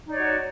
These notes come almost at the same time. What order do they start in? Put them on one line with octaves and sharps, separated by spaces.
D#4 D5 C#5 F#4